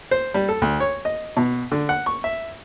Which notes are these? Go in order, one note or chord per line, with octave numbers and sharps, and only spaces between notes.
C5
G3
A4
D2
C#5
D#5
B2
D3
F#5
C#6
E5